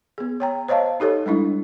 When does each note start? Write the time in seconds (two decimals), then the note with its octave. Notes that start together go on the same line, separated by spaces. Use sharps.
0.18 B3 G#4
0.40 C#5 G5 A#5
0.68 C5 C#5 D#5 F5 A5
1.00 D#4 G4 A4 C#5
1.26 G3 G#3 D4 E4